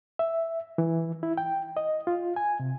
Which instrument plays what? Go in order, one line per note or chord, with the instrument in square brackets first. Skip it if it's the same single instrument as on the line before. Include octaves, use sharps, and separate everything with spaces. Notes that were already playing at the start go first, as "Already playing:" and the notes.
[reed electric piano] E5
E3
E4
G5
D#5
F4
G#5
C3